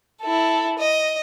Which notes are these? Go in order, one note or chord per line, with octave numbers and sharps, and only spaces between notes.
E4 A4
D#5